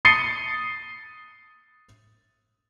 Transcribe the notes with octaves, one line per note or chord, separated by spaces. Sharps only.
D#6 A6 C7 C#7 D#7 G7